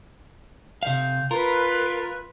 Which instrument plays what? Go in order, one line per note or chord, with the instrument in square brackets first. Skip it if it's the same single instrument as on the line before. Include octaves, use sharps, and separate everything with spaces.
[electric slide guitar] C3 F5 [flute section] G6
[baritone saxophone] F4 [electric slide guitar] A#4 [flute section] B4